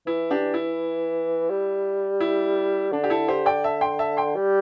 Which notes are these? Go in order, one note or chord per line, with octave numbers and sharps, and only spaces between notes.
E3 E4
D4 G4
E4
G3
E4
D3 D4
G4
E4 A4
G4 C5
D5 G5
E5 A5
G5 C6
E5 A5
G5 C6
G3